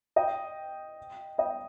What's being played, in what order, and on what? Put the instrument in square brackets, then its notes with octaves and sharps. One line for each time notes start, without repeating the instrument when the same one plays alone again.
[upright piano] D#5 G5
D#5 G5